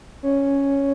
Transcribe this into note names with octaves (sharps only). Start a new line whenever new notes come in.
C#4